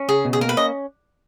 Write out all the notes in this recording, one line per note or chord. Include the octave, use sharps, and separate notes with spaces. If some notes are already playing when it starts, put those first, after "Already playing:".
Already playing: C#4
C#3 G#4
B2
G#4
A#3 A#4
B4
C#4 D#5